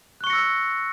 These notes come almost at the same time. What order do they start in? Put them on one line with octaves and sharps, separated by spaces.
F#6 C#6 C#7 A#6 E6